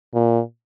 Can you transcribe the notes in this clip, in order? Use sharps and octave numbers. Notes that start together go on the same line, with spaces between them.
A#2